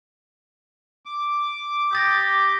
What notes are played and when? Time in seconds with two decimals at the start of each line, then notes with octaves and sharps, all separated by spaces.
1.06 D6
1.93 G4 D#6 A6 A#6